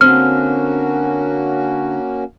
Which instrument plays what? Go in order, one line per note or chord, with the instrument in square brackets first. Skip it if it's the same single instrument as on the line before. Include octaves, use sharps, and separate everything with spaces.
[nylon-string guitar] D3 C4 [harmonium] A#3 C#4 F#4 [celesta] F6